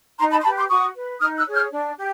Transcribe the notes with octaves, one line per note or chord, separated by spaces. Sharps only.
D#4 A#5 C6
A5 B5
C6
G4 B4 A5 B5
C6 D6
F#4 C#6 D#6
B4
D#4 D#6 F6
E6 F#6
G#4 C#5
F6 G6
D4
G4